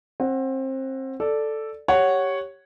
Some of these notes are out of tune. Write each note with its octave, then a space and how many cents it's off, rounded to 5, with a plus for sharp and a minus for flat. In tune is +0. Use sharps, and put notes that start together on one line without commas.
C4 +25 F#5 +0
A4 +0 D5 +0
G4 +0 C#5 +0 F#5 +0